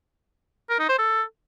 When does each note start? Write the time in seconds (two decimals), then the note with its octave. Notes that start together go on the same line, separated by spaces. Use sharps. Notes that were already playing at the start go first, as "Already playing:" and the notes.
0.70 A#4
0.80 D#4
0.89 C5
0.99 A4